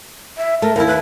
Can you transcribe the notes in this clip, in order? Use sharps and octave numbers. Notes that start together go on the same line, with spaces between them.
E5
A3 A#4
D#2 E4 A#4
B4